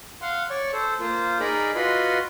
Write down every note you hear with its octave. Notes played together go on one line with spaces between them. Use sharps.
F5 F#5 C6
C#5 D5 C#6
A4 C5
A#3 F4 C5
D#4 G#4 A#4 D5 A#5 B5
F4 F#4 B4 D#5 B5 C6